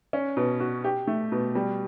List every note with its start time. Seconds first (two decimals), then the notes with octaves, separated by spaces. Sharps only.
0.13 C#4
0.37 B2
0.60 F#4
0.84 G4
1.08 A3
1.32 B2
1.55 G3